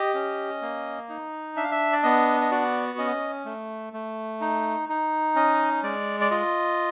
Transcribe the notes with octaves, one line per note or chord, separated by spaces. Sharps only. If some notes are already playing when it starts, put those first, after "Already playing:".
Already playing: G4 D#5
C#4
A#3
D#4
D4 E5
F5
E5
D5
B3 D#5
D#5
F#4 D5
C#4 D#5
A3
A3
D#4
D#4
C#4 D#5
G#3 D5
D5
F4 D#5